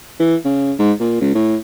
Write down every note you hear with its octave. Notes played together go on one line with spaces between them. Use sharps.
E3
C#3
G#2
A#2
C#2
A2